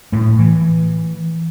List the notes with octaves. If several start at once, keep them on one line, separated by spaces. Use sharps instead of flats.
A2 A3
E3